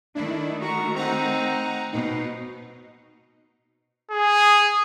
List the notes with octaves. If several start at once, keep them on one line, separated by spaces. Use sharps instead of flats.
D#3 A3 D4 E4
F#4 A#5 C#6
C4 D#4 F#5 A#5
B2 D#4
G#4